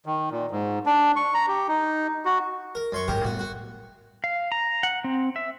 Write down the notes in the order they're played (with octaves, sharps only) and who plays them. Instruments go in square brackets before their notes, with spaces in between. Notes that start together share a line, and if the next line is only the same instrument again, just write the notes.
[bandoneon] D#3
A#2
G#2
D4
C#6
A#5
G4
D#4
F#4
[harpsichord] A#4
F#2 C6 C#6
[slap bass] G#1 G#2 G#3 [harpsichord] G4 A#4
[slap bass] A2 G3 B3 [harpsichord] F#4
[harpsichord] F#4
[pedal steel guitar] F5
A#5
F#5
C4
E5